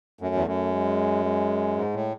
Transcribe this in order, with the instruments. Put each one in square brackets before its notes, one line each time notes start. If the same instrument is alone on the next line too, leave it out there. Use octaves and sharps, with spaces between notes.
[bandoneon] F#2 [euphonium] A3
[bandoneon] E2
F#2
[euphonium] G#3
G#3
[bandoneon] G#2
A2